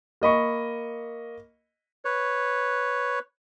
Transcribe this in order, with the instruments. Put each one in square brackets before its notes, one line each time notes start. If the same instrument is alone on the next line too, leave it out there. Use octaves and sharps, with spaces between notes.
[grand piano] A#3 D#5 B5 C#6
[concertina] B4 C#5